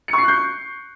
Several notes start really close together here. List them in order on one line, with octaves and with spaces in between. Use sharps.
C#7 C#6 C7 F#6 G6